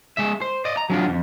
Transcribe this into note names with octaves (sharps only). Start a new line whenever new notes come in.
G#3 E5
C5
D5 D#5
A#5
F#3 D4 F4
F2